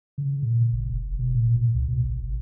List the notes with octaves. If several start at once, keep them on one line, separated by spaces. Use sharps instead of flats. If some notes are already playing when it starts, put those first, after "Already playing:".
C#3
A#2
G#1
F1
B2
A#2
A#2
C#2
B2
A1
G1